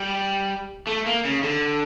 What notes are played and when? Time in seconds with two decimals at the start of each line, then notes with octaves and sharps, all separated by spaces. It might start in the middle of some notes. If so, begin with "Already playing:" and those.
Already playing: G3
0.87 A3
1.06 A#3
1.25 C#3
1.43 D3